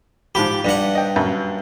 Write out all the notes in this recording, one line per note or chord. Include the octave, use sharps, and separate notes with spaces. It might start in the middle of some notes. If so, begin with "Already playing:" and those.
G#2 F3 G4 B5
G2 F#5
D#5 G5
F#2